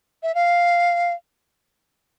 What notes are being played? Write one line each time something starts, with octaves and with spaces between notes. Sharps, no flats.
E5
F5